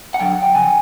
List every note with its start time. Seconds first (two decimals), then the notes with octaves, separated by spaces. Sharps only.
0.14 F#5
0.20 F#2 D3 F#3 G5
0.32 F#5
0.43 G5
0.55 F2 C#3 G#5